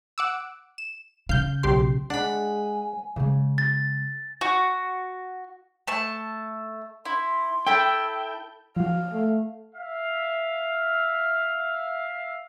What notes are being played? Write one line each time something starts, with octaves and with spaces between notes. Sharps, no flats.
F#5 D6 E6
E7
C#3 F5 G6
B1 G4 C6
G#3 D4 F#5 G#5 B5
C#3 G#3
A6
F#4
A3 A5
E4 C6
E4 A4 G5 B5 E6
F3 F#4 F5
A3
E5 F5